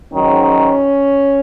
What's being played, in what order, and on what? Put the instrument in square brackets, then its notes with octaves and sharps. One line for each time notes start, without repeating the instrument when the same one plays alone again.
[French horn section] G#2 D#3 F#3 C#4